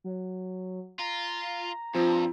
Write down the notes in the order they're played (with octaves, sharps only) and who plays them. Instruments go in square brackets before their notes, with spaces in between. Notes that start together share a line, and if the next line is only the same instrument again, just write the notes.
[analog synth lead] F#3
[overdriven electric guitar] F4 [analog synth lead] A#5
[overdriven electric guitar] G2 [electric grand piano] F3 C4 [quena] F4